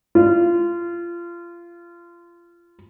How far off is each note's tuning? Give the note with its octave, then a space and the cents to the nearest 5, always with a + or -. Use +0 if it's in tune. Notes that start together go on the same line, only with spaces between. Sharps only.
F4 -25